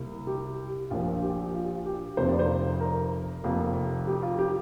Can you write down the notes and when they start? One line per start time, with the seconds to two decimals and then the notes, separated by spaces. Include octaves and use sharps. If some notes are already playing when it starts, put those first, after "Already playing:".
Already playing: C2 C3 A#3
0.27 G4
0.90 A#1 A#2 F3 F4
1.22 G4
1.54 F4
1.86 G4
2.17 F1 F2 C3 F3 A#3 C5
2.29 D5
2.39 C5
2.80 A#4
3.44 F1 F2 C3 F3 A#3
4.07 G4
4.22 F4
4.39 G4